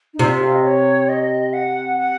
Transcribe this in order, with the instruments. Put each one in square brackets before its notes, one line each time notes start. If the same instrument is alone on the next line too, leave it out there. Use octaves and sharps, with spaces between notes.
[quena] D#4
[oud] C3 [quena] F4
[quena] F5
D#5
C#5
D#5
F#5
F#5